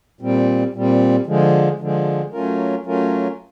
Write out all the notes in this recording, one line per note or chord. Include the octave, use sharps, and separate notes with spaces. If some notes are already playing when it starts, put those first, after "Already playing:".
A#2 G3 C4
A#2 G3 C4
D3 F3 G#3
D3 F3 G#3
F#3 A3 C#4 F4 A#4
F#3 A3 C#4 F4 A#4